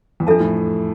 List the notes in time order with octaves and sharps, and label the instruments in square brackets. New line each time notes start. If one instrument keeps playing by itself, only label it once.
[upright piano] E2
[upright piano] F2 [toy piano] D4 F4 A4 E5 A5
[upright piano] A2